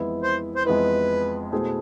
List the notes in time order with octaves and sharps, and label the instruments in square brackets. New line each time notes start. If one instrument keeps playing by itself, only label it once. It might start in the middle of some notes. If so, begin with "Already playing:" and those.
Already playing: [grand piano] F2 E3 G#3 B3 E4
[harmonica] C5
C5
[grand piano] F2 E3 G#3 B3 E4 [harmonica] B4
[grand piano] B2 A3 E4 G#4 C5